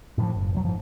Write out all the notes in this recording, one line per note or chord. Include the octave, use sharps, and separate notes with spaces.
A2 E3 F3
F#1
D#1 F3 F#3
G#2 F3